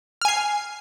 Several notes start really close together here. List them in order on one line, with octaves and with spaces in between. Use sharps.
F6 G#5 C7